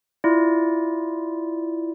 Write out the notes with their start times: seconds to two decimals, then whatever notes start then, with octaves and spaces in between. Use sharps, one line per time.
0.24 E4 F4 D5